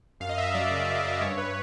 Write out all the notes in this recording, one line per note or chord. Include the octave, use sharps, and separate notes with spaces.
F#2 F5
D#5
F#2 E5
F#3 D5
C#3
F#2
F#2
G2 C#5
B4